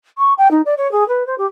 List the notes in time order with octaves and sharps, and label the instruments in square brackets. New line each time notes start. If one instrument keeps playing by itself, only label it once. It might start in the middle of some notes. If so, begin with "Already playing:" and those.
[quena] C#6
G5
D#4
D5
C#5
G#4
B4
C5
G4